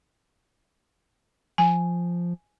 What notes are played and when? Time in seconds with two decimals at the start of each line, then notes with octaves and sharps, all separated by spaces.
1.58 F3 G#5